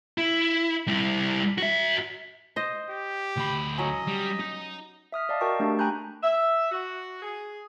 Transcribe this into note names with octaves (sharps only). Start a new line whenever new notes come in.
E4
G3 E4
F#4 E5
C5 D#5
G4
D2 B5
F#3 C#4 D#5
G3
D#4
E5 D#6 F6 B6
D5 D#5 F5 A5
F#4 A#4 G5 A5 C#6
A3 D4 G4 C#6
G5 G#5 A#5 B5 F#6 G6
E5
F#4
G#4